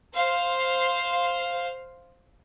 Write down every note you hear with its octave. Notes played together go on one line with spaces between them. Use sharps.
C5 F5